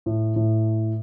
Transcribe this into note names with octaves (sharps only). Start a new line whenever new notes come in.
A2
A2